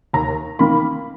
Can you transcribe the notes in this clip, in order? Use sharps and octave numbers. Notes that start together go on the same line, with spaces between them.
D#2 A#5
D#3 A#3 B5